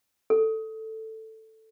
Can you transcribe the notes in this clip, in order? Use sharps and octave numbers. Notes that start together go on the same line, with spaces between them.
A4